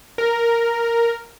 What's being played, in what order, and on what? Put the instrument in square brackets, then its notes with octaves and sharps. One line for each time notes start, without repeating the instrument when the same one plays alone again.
[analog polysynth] A#4